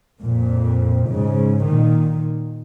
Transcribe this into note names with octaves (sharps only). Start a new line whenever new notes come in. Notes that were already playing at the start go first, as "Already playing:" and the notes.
F2 A#2
G#2 C#3
A#2 D#3